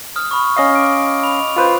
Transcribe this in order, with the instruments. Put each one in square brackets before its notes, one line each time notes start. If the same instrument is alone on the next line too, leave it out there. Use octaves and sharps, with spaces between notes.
[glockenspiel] D#6 F6
B5 C#6
[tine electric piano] C#4 D#5 F5 [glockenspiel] C#6
[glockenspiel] D6 D7
B5 F7
[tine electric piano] F4 B4 C5